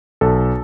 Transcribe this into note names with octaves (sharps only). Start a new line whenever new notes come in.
B1 A4